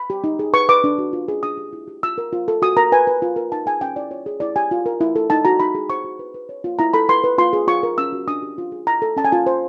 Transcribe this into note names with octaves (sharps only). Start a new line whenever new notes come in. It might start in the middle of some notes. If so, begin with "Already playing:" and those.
Already playing: B5
G4
D#4
G#4
B4 C#6
B4 D6
D4
F#4
F4
G#4
D4 D#6
G4
E4
G4
F4 E6
A#4
F4
A4
F#4 D#6
A#4 A#5
B4 G#5
B4
F4
A#4
D#4 A5
G#4 G#5
C#4 G5
E4 D5
F4 C#5
G#4
E4 D5
G4 G#5
F4
A#4
E4
A4
D#4 A5
F#4 A#5
D#4 B5
G#4
C5 C#6
F#4
B4
B4
C#5
F4
E4 A#5
A4 B5
B4 C6
B4
F4 C6
G#4
F4 C#6
A#4
C#4 E6
F#4
D4 D#6
G4
F4
G#4
E4 A#5
A4
C#4 A5
G#5
F4 A5
C5